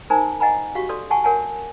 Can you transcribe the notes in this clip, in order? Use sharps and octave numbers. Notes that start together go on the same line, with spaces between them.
D#4 A#4 C5 G#5 A#5
D#5 F#5 G#5 A#5 B5
F#4 G4 F5 C#6
A4 D5 C6
F#5 G#5 A5 C#6
A#4 C#5 F#5 G#5 A5